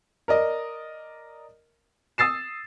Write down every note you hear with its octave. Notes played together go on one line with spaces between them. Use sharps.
A#4 D5 D#5
D#6 E6 A6 C7 E7